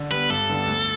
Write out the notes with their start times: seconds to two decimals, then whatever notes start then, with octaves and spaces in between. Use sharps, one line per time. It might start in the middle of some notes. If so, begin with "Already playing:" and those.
Already playing: D3
0.11 G3 B3 B4
0.30 G2 A4
0.49 D3 G3 B3 D4
0.68 D2